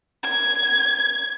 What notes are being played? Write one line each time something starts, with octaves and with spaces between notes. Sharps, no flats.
G#6